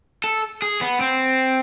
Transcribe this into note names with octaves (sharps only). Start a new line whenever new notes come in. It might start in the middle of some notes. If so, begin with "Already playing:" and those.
A4
G#4
B3
C4